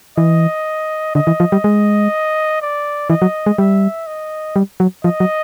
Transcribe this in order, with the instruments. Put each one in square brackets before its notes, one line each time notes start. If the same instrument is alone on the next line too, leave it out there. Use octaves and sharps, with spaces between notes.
[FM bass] E3 [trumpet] D#5
[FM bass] D3 [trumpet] D#5
[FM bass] E3
F3
G3
G#3
[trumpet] D5
[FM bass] E3 [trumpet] D#5
[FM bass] F#3
G#3
[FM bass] G3 [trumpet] E5
[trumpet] D#5
[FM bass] G3
F#3
[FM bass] F3 [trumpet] D#5
[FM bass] F#3